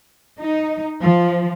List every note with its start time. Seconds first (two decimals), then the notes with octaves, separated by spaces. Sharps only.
0.40 D#4
1.01 F3